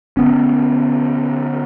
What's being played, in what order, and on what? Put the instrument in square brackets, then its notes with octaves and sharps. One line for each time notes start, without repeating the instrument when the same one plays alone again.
[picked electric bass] D3 B3 C#4